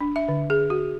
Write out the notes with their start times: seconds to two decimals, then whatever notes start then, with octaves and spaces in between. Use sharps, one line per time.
0.01 D4
0.16 E5
0.29 D3
0.50 G#4
0.70 F#4